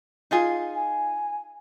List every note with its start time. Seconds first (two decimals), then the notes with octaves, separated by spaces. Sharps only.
0.31 D#4 F4 G#4
0.75 G#5